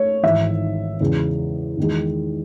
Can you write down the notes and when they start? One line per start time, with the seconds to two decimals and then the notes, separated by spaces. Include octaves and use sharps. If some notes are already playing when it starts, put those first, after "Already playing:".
Already playing: A3 C#5
0.23 G#1 G#2 E3 E5
1.00 E2 C#3 G#3
1.77 E2 D#3 G#3